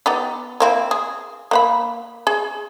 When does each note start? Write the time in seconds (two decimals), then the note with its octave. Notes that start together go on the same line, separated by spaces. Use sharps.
0.06 B3 D#4 G4
0.60 A#3 C4 E4
0.91 G#4
1.51 A#3 F#5 B5
2.27 G#4